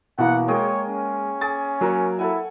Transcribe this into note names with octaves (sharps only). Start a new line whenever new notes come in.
B2 E3 A#3 E4 F#4 F#5
G#3 G#4 A#4 C#5 G5 D#6
C#4
G#4 C#6 D6 A6
F#3 A#3 A#4 C#5
E4 A4 F#5 G#5